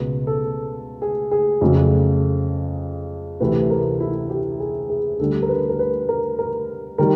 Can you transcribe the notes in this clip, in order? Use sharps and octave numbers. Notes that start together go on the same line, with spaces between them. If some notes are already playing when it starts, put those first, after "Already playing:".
Already playing: C#2 B2 G#3 B4
A4
G#4
G#4
F2 C#3 F#3 A3
D2 C3 E3 A3 B4
A#4
E4
G4
G#4
G#4
D2 D3 G3 A4
A#4
B4
A#4
B4
A#4
A#4
D#3 G3 A#4